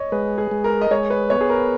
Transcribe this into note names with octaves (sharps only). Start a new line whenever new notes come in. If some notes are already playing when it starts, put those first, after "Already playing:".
Already playing: C#5 D#5
G#3 B4
G#4
G#3
A#4
D#5
G#3 C#5
B4
B3 C#5
G#4
A#4